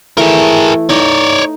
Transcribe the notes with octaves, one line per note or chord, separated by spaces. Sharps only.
E3 A3 G#4 A#4
D#4 C#5 D5